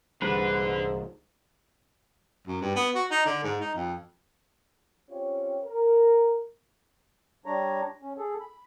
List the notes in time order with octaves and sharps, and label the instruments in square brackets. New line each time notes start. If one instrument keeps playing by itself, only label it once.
[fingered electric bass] C2 E3 G3 [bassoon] G#2 [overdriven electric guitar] D3 [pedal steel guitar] B4
[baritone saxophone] F#2
G2
B3
F#4
D#4
D3
G#2
D#4
F2
[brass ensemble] C4 C#4 F4 G4 C#5
A#4
[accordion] G3 D4 C#5 A#5
C#4
G#4 A4
B5